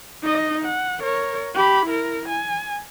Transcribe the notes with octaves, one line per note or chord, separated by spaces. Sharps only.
D#4 D#5
F#5
A#4 C#5
G4 B5
E4 A#4
G#5